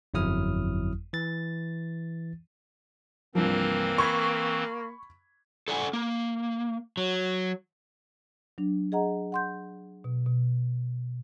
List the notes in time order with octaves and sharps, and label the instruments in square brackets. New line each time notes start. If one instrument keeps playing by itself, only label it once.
[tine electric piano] G1 F2 F#3 E4 D#6 F6
E3 A6
[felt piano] C2 G2 F3 [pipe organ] E3 C4 [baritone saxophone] A#3
[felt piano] B5 G#6 B6 [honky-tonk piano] C#6
[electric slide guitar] A4 D5 F#5 G#5
A#3
F#3
[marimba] F#3 D4
G#4 D#5 F#5 A#5
F#5 C6 G6
B2
B2